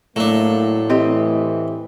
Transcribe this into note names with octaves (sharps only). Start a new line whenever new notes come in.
A2 F#3 A3 A#3 D4
E3 C4 G4 D#5